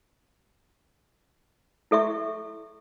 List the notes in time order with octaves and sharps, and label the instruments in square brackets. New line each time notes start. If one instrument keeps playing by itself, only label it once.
[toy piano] E4 A4 E5 C#6